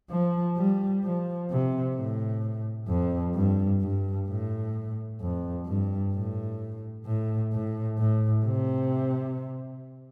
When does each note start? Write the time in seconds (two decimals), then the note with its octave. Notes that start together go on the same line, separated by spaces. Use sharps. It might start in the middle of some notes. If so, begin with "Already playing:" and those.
0.11 F3
0.56 G3
1.04 F3
1.50 C3
1.95 A2
2.88 F2
3.35 G2
3.81 G2
4.27 A2
5.21 F2
5.66 G2
6.13 A2
7.06 A2
7.52 A2
7.98 A2
8.45 C3